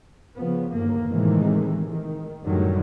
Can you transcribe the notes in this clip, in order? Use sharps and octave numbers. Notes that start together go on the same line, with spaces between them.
C#3 F3 B3
G1 D#2 A#3
A2 C3 D#3 E3 G#3
D#3
F#2 A2 D3 D#3 F#3 G3